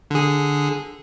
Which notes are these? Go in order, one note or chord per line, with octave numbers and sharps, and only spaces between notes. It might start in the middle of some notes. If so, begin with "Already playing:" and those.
D3 G#4